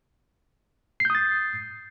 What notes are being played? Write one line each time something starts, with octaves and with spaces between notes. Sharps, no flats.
D#6 G6 A6 C7